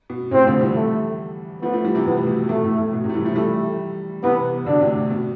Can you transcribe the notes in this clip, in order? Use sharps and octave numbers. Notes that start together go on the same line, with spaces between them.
B2
A2 C3 C4
D3 F3
E3 G3
A3
F3 A3 B3
F3 A3
E3 G3
C3 E3
A2 B3
B2
B2 A3
A2
A2
B2
A2 C3
A3
E3 G3
F3 A3
E3 G3 A3
C3 E3 B3
B2 D3 D4
A2 C3
B2